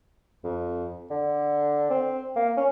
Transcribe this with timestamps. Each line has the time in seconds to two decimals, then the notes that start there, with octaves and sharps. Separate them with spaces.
0.44 F2
1.11 D3
1.90 C4
2.36 A#3
2.57 C#4